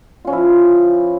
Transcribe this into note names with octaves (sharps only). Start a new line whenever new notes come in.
F3 C#4 E4 F4